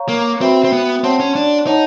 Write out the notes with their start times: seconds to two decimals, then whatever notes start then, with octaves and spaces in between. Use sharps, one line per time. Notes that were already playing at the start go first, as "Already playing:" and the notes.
Already playing: C#5 F5 A#5 C#6
0.09 A#3
0.41 C4 F#4 B4 E5 G5 B5
0.64 C4
0.72 B3
1.03 C4 C#5 F#5 A5 C6
1.20 C#4
1.35 D4
1.67 D#4 C#5 F#5 A5